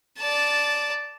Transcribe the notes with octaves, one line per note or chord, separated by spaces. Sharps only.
D5 A5